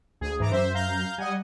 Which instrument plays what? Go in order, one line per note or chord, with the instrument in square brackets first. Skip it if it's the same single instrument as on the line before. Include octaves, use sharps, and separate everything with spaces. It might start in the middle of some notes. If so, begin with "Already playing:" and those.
[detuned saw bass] D2 [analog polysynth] G#4
[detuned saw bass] G#2 [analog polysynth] E3 A#5 D6
[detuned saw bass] F#2 [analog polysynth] C5 E5
[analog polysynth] F5 A#5 G6
[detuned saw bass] G3 [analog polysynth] D#5 F#5 G#5